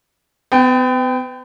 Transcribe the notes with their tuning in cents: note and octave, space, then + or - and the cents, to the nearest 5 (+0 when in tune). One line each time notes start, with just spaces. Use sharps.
B3 +40 G5 +0